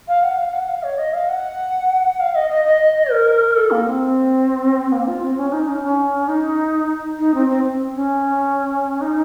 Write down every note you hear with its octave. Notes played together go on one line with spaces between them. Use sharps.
F5
F#5
F5
F#5
F5
C#5
D#5
F5
F#5
F5
D#5
D#5
D#5
A#4
A4
A#3
C4
A#3
F4
C4
C#4
D#4
C#4
C#4
D#4
D#4
C4
C4
C4
C#4
D#4